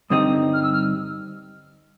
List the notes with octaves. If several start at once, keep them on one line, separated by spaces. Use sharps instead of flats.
G2 D3 G3 C4 D#4 D#6
F6
E6
F6